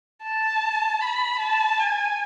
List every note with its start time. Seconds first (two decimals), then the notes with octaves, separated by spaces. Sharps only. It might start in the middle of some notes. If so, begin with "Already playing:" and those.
0.23 A5
1.01 B5
1.39 A5
1.79 G#5